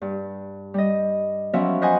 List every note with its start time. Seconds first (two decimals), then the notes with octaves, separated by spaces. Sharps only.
0.01 G2
0.74 G3 D#5
1.53 F3 F#3 B3 C#4 F#4 E5
1.82 B4 C5 D#5 F#5 G#5